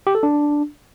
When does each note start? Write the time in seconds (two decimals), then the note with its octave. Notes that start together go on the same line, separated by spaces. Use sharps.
0.07 G4
0.15 A4
0.23 D4